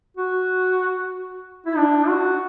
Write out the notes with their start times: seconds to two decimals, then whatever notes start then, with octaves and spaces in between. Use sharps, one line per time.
0.17 F#4
1.67 E4
1.77 D4
2.08 F#4